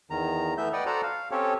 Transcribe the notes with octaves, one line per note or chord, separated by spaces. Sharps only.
E2 D#3 A#5
E3 A3 B3 E5 G6
B4 D5 D#5 F#5 G5
F#4 A4 C5 D5 F#5 A#5
F5
C4 C#4 G4 A4 C#5